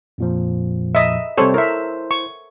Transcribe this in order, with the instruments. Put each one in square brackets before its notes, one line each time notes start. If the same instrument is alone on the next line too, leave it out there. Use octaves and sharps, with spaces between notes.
[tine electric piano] F2 A#2 F3
[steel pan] D#5 E5
[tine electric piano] C3 G3 C4 [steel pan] A4 C5 C#5
[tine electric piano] E4 C5 [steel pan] A#4 E5
[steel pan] C#6